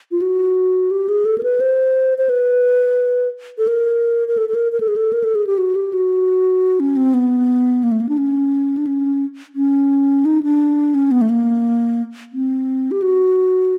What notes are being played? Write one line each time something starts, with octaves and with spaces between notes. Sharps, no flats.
F4
F#4
G4
G#4
A4
A#4
B4
C5
C5
B4
A4
A#4
A#4
A4
A4
A#4
A#4
A4
G#4
A4
A#4
A4
G#4
G4
F#4
G4
F#4
C#4
C4
B3
A#3
A3
A#3
D4
C#4
D4
C#4
C#4
D#4
D4
C#4
B3
A3
A#3
C4
G4
F#4